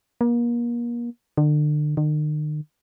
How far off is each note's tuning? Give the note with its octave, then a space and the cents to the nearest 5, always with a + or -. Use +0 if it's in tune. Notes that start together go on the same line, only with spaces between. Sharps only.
A#3 +35
D3 +35
D#3 -45